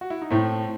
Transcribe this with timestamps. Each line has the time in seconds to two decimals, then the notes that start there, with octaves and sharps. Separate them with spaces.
0.01 F#4
0.10 E4
0.22 D#4
0.30 A2 A3 C4